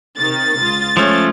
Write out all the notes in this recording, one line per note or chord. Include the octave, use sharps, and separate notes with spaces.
C3 D#3 A6
C#2 F4 D#6
F3 G#3 A3 C#4 C#5